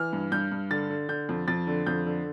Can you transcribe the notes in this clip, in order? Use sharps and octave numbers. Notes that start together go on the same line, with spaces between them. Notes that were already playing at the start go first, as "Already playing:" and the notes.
Already playing: E3 F6
G2
G2 G6
G2
D3 A6
D3
D3 G6
F2
F2 A6
D3
F2 G6
D3